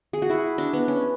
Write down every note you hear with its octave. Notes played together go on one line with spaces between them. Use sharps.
G#4
F#4
E4
D4
B3
C#4